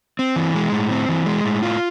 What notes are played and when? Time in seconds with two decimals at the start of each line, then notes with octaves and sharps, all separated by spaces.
0.19 C4
0.36 E3
0.55 G#3
0.72 A2
0.91 C4
1.09 E3
1.26 G#3
1.44 A2
1.63 F4